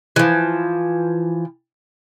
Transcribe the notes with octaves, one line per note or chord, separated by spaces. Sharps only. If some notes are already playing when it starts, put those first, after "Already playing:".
E3 F3